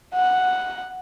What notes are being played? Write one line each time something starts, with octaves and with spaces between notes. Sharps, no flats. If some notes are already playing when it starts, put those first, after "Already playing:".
F#5